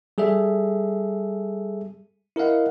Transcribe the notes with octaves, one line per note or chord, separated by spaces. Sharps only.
G3 G#4 A4 E5
E4 A#4 D#5 F5 F#5